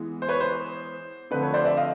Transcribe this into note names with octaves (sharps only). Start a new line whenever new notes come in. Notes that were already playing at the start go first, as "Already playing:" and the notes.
Already playing: E3 G#3 B3
C5
B4 C#5
C5
D3 F3 A3 C4 B4
B4 C#5
C5 D5
D5 E5
D#5 F5